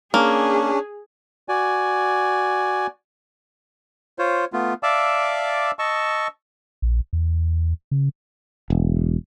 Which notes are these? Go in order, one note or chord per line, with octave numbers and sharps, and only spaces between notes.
A#3 C#4 D4 G#4
F#4 D5 G#5
F4 C5 C#5
A3 B3 F4
D5 E5 F5 A5 D6 E6
D#5 A5 C#6 E6
A#1
E2
C#3
E1